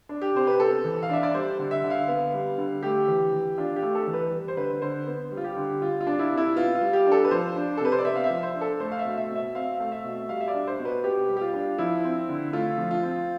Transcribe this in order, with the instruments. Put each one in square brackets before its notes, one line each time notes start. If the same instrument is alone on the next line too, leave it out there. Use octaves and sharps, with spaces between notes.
[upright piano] D4
G4
C3 C5
B4
B3 A4
E3
F5
D4 E5
D5
G3 C5
D3
E5
D3
F5
B3
G3
D3
A3 G4
E3
E3
D4 F4
G4
A3
A4
E3
B4
G3
C5
D3 B4
D3 C5
B3
G3
F4
G4
D3
G3 F4
F4
D4
E4
C3
E4
B3 F4
F4
G3
G4
D4
A4
B4
F3 C5
D4
A4
C3 B4
C5
D5
B3 E5
F5
E5
F3
C5
D4
A4
A3 C5
F5
E5
B2
E5
B2
E5
C4 F5
A3 F5
E5
B2
G3 F5
E5
D5
D4
C5
B2
B4
B3 G4
G3
G4
F4
D4
F3 E4
C4
D3
A3 F4
F3
F4
C4